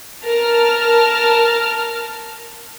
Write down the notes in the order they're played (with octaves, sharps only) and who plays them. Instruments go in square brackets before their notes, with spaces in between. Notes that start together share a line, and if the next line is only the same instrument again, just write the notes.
[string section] A#4 A5 F6